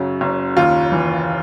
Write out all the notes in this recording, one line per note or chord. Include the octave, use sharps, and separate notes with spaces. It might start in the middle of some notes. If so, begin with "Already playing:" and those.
Already playing: F#2 C#3 F#3
F#1
D#2 F4
E3